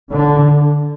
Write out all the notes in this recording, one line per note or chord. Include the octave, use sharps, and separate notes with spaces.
D3